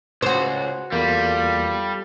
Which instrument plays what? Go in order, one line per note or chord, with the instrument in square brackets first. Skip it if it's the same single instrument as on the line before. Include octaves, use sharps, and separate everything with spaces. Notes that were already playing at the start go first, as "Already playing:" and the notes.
[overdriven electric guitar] C#2 [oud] F#4 C5
[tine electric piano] E2 A#3 [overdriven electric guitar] G3 [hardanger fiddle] F4 A4